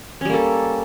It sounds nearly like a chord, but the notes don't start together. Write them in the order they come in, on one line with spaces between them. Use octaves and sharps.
C#4 G3 A#3 A4